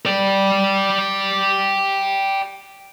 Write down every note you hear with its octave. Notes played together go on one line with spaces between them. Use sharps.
D5 G5